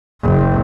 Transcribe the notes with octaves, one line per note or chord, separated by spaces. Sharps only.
F#1